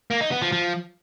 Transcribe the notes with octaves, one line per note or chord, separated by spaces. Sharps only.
A#3
D#4
B3
F3
F3